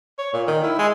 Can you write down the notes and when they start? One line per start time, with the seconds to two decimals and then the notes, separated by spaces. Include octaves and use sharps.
0.18 C#5
0.33 A#2
0.47 D#3
0.63 E4
0.79 G#3